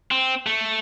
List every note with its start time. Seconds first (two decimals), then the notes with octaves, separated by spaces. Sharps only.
0.11 C4
0.46 A3